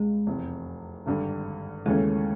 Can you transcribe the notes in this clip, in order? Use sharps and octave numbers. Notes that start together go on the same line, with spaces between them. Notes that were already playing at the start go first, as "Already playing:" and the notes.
Already playing: C#2 B2 G3 G#3
F1 E2 C3
G#1 G2 D3 G3
D#2 C#3 E3 G#3 A3 C#4